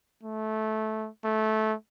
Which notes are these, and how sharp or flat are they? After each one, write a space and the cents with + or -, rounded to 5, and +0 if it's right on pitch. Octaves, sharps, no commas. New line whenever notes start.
A3 -15
A3 -15